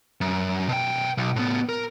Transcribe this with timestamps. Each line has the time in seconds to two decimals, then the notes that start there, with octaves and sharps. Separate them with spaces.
0.21 F#2
0.69 B2 G5
1.18 B1
1.36 A2 B3
1.69 A#4